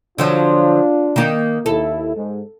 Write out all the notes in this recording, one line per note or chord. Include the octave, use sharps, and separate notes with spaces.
D3 F3 F#3 D4 F4
D#3 A#3
D#2 E4 A4
G#2